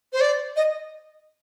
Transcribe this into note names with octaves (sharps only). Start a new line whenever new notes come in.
C5
D5
D#5